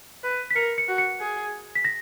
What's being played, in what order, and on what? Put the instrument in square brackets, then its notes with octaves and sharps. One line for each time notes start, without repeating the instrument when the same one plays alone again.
[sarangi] B4
[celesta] B6
[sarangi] A#4 [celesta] C#7
[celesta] C#7
[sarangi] F#4
[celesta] C#7
[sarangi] G#4
[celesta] B6
A#6